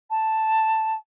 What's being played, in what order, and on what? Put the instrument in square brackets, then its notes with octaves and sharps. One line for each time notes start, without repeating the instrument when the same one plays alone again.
[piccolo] A5